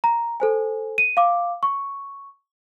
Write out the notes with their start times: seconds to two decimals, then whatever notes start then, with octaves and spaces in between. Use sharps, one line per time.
0.04 A#5
0.40 A4 C5 G#5
0.98 D#7
1.17 F5 D6
1.63 C#6